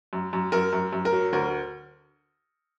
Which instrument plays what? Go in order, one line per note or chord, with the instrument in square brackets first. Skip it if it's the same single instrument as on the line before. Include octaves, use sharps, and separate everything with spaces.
[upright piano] F#2
F#2
F#2 A#4
F#2
F#2
A#4
F#3
D2 A#4